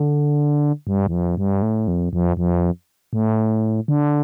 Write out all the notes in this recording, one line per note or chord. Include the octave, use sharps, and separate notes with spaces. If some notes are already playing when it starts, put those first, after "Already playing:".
Already playing: D3
G2
E2
F2
G2
A2
F2
F2
F2
A2
D3